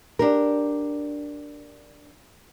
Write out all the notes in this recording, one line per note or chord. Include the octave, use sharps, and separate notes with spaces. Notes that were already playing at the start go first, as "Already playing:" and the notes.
D4 G4 A#4